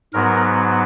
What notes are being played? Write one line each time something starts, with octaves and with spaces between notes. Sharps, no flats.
G#2 F#3 B3 A#4